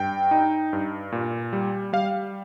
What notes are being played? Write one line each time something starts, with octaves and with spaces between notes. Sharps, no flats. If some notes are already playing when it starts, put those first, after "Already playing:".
Already playing: G2 G5
D#4
G2
A#2
G3
G3 F5